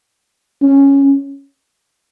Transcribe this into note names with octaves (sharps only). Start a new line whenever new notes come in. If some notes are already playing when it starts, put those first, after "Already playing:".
C#4